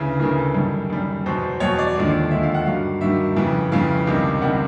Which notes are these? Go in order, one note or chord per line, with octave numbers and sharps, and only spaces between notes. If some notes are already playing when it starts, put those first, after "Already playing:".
Already playing: D2 C#3 E3
D2 C#3 E3 A#4
A4
F#2 D#3 G3
F#2 D#3 G3
E2 B2 F#3 C5
E2 B2 F#3 C#5
D5
D#2 D3 F3 G#3
D#2 D3 F3 G#3 E5
F5
F#5
G2 D#3 F#3 F5
G2 D#3 F#3 E5
F2 C#3 E3
F2 C#3 E3 F5
C#2 C3 D#3 G3
C#2 C3 D#3 G3 F#5